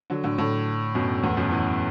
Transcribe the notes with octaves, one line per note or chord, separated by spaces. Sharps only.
D3 F#3
A2 D3
A2 D3
F#2 B2
E2 A2
F#2 B2
B2 E3